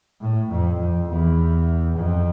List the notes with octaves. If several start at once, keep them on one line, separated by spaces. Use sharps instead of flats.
A2
F2
F2
E2
F2